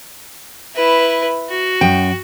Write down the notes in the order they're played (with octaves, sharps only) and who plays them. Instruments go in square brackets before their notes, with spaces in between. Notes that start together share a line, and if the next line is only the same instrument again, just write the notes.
[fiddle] E4 B4
F#4
[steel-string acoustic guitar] F#2 G5